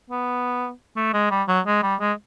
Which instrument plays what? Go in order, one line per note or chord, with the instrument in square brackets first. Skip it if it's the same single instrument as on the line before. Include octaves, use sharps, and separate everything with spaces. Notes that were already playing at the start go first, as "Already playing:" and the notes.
[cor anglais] B3
A3
G#3
G3
F#3
G#3
G3
G#3